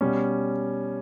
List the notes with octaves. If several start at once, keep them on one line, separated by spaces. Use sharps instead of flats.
B2 G3 C#4